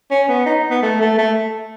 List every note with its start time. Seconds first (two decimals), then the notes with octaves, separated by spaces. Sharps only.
0.11 C#4
0.28 B3
0.46 D#4
0.70 B3
0.82 A3
1.01 A3
1.18 A3